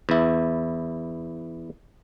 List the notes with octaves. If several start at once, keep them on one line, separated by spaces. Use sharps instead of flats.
E2 E4